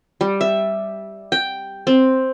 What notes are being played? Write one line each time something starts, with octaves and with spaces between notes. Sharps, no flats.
G3
E5
G5
C4